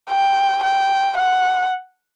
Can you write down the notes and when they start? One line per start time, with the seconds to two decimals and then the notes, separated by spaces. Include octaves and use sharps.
0.10 G5
0.63 G5
1.17 F#5